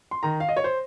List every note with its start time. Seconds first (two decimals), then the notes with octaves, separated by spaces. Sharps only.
0.11 C6
0.23 D#3 A#5
0.40 F5
0.49 D#5
0.57 C#5
0.64 C5